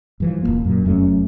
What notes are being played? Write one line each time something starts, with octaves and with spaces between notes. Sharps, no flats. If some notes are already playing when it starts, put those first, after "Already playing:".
G2 E3 F3
D#1 D#2 A#3
F#2 A#2
F1 F#2 A3 C#4